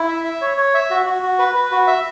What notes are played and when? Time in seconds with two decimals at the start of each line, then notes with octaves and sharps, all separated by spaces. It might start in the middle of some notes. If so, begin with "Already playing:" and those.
Already playing: E4
0.08 E5
0.24 E5
0.41 C#5
0.57 C#5
0.74 E5
0.90 F#4
1.06 F#4
1.22 F#4
1.39 B4
1.55 B4
1.72 F#4
1.87 E5